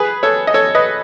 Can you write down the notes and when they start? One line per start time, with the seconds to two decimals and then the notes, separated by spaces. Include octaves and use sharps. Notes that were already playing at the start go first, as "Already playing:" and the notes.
Already playing: G#4 B4
0.23 A4 C#5
0.47 D#5
0.54 A4 C#5
0.75 B4 D#5